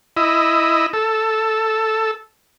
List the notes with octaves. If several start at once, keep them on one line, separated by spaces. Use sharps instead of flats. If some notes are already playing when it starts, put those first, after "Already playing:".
E4 D#5
A4